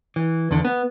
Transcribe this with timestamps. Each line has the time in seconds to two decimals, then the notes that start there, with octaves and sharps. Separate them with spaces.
0.16 E3
0.51 E2 D3
0.65 B3